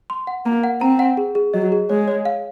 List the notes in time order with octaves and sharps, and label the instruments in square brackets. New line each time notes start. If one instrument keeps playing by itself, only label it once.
[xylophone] C6
F#5
[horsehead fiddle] A#3 [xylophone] A#5
[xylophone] F#5
[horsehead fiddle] C4 [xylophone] A#5
[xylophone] F#5
G#4
G#4
[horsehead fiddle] F#3 [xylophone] D#5
[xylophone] G#4
[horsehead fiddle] G#3 [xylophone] C#5
[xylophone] C#5
F5